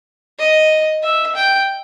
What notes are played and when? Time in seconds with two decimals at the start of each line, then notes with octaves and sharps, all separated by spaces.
0.39 D#5
1.03 E5
1.35 G5